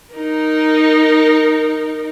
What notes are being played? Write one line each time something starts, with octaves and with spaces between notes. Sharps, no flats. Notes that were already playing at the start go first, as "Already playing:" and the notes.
D#4 A#4